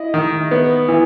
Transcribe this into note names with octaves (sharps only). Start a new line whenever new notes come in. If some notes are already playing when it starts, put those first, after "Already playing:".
Already playing: E4 D#5
D#3
B3
E3